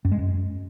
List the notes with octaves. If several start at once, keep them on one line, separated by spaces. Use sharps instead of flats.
F#2
G#3
F#2